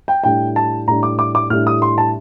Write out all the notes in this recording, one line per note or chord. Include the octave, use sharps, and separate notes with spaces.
G5
A2 G3 D4 G5
A5
A2 G3 D4 A#5
D6
D6
D6
A2 G3 D4 F6
D#6
C6
A5